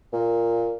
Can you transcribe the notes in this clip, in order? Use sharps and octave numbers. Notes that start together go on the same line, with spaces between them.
A#2